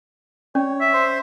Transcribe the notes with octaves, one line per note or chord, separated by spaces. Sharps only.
C#4 C#5 D5
E5
C5